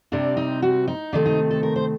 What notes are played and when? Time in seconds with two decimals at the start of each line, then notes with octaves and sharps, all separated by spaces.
0.12 C3 G3 C4 D4
0.37 D#4
0.62 F#4
0.88 D#4
1.13 C3 D#3 A3 C4 D4
1.26 D#4
1.51 A4
1.63 A#4
1.76 C5